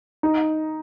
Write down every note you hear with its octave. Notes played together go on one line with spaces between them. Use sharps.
D#4